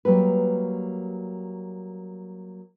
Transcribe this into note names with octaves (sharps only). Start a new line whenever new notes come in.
F#3 G3 A#3 B4